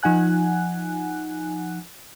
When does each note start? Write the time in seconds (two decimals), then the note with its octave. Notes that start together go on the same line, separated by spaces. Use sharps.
0.03 F3 D#4 F#5 G#5 F#6